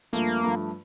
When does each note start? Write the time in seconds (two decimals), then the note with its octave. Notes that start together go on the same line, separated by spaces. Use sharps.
0.13 G2 F3 A3 A#3
0.43 G2 F3 A3